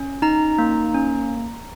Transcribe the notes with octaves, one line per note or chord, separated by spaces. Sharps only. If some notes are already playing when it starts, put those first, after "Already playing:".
Already playing: C#4
D#4 A#5
A#3
C#4